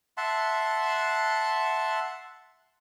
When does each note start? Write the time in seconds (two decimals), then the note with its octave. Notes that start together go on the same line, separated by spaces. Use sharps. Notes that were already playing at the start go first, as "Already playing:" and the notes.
0.17 E5 F#5 A5 C6